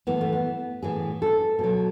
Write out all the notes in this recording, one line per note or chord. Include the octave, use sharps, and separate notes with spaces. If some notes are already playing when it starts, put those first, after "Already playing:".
A2 E3 B3
A3
B3
A2 E3 G#4
A4
B2 F#3